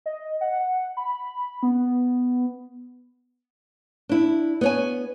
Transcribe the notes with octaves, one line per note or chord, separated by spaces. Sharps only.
D#5
F#5
B5
B3
D4 E4
B3 C#5 G#5